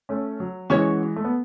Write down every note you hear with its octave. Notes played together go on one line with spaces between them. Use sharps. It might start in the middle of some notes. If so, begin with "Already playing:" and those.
A3 C#4
F#3
E3 G#3 C#4 F#4 C#5
A3
B3